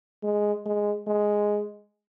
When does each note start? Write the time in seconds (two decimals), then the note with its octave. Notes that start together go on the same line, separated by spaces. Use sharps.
0.24 G#3
0.66 G#3
1.07 G#3